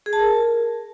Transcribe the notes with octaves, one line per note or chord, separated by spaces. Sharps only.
G#4
A5
A#4